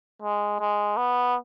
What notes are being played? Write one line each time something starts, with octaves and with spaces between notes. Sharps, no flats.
G#3
G#3
B3